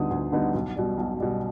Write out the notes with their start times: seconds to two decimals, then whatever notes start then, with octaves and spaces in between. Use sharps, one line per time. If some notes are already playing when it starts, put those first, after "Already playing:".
Already playing: D2 D3 G3 B3 D#4 D#6
0.10 D2
0.32 D3 G3 B3 D#4
0.54 B1
0.76 B2 G3
0.98 B1
1.20 B2 G3